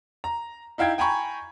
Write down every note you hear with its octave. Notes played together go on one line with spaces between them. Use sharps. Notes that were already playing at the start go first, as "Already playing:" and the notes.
A#5
D#4 E4 F5 G5 G#6
G5 G#5 A#5 B5 C#6